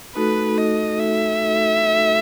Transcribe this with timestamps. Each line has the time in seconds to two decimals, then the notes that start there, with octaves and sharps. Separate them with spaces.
0.16 A3 D#4 F#4 A4 B4
0.58 D#5
1.00 E5